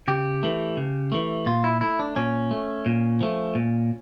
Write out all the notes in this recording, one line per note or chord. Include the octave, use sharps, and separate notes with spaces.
C#3 G4
E3 A3
C#3
E3 A3
A#2 F4
E4
A3 E4
D4
A#2 C#4
A3
A#2
F3 A3
A#2